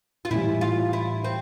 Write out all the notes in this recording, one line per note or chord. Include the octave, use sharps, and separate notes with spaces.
F4
A2 E3 G3 E4
F4
E4
C4